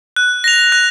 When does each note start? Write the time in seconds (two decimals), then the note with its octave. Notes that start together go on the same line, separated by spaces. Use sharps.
0.16 F#6
0.44 A#6 F7
0.72 F#6